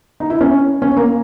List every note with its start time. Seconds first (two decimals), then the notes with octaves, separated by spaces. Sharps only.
0.20 D#4
0.30 E4
0.41 C#4
0.82 C#4
0.97 A#3